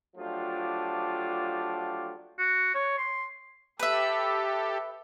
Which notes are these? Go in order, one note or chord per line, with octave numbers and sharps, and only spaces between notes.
F3 F#3 A3 D4 F4 G4
F#4
C#5
C6
G4 A4 B4 E5